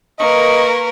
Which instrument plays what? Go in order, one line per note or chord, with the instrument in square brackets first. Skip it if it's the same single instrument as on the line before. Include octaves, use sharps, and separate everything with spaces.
[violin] A#3 C#6 [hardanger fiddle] A#4 B4 [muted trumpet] D#5